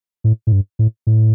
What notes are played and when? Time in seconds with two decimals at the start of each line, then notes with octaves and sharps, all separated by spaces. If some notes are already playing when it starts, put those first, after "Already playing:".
0.24 A2
0.47 A2
0.52 G2
0.79 A2
1.07 A2